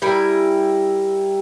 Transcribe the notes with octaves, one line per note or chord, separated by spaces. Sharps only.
G3 E4 A#4 G#5